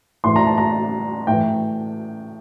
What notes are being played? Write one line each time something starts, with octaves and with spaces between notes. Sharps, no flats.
A2 E3 C6
A#5
A5
A#5
A2 E3 G5